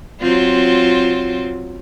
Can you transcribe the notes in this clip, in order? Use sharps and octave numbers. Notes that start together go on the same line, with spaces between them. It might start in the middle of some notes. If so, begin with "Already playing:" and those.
F#3 C4 F4